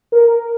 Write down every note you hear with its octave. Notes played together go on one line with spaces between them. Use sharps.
A#4